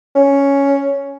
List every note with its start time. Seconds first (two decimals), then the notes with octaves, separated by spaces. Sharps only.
0.15 C#4